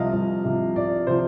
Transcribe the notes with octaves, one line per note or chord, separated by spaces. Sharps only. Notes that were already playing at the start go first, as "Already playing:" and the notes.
Already playing: C2 C3 F3 D#5 F5
C2
C3 F3
C2 D5
C3 F3 C5